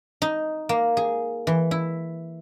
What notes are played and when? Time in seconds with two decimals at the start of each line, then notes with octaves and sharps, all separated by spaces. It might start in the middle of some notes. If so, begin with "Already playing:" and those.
0.22 D#4
0.69 A#3
0.97 G#4
1.47 E3
1.71 E4